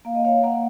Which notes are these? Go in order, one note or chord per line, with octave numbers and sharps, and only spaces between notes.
A#3 F5
D#5
C#5 F5
A#3 F#5 A#5